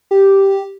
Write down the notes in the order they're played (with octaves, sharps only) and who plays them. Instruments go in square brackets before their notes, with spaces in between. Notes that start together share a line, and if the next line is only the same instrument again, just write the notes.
[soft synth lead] G4